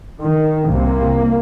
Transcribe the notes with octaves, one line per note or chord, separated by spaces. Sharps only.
D#3
C2 C3 A#3